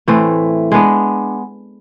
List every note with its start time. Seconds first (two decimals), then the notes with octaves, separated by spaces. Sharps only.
0.08 A2 E3 A3 C4
0.72 G#3 B3 D4